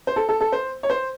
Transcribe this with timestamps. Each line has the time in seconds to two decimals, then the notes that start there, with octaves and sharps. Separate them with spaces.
0.07 C5
0.16 A4
0.29 A4
0.41 A4
0.52 C5
0.83 C#5
0.90 C5